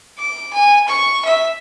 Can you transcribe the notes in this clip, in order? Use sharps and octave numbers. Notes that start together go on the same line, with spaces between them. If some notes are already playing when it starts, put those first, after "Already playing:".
D6
G#5
C#6
E5